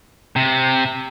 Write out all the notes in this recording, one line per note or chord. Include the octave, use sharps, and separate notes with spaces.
C3